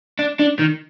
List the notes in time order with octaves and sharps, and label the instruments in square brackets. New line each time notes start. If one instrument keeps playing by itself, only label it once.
[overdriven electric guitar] D4
D4
D#3